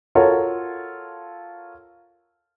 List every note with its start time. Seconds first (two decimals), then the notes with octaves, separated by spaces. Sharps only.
0.15 F4 F#4 A4 A#4 C#5